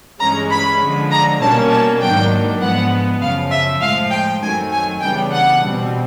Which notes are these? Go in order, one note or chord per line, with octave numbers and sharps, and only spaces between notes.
G2 E3 G#3 C#4 A#5
B5
D3 F3 G#3
A#5
B2 G3 A#3 C#4 A5
A5
G#2 D#3 F#3 A#3 D4 G5
G#2 F3 G#3 B3 F#5
F#2 C#3 F3 F5
E5
A2 F3 G#3 F5
G5
F#2 D#3 F#3 A3 C4 G#5
G#5
C#3 E3 G3 B3 D4 G5
F#5
B2 G3 C4